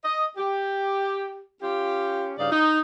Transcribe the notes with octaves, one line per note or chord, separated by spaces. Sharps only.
D#5
G4
C#4 F4 G4
G2 C#3 D#4 D5 F5
D#4